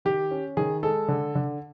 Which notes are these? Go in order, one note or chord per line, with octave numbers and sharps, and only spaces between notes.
D#3 G4
C#4
D#3 G#4
G#3 A4
D3
D3